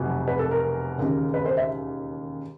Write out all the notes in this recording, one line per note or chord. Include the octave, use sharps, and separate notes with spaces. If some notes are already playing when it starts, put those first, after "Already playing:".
Already playing: F1 E2 B2 F#3
B4
A4
A#4
E1 D#2 C#3
B4
C5
E5